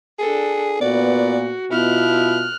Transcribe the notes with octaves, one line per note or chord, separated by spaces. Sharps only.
D4 G#4 A4
A#2 B3 F#4 D5
B2 E4 F4 F6 F#6